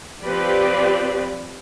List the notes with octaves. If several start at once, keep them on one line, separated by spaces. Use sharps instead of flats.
F3 C4 G4 B4 D5